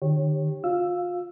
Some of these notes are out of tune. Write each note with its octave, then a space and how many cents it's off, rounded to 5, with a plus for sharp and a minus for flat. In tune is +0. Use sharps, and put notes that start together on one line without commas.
D#3 -45 G4 +0 C#5 -20
F4 +35 F5 +5 E6 +5